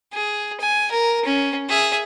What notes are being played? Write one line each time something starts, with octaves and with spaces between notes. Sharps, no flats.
G#4
G#5
A#4
C#4
G#4 E5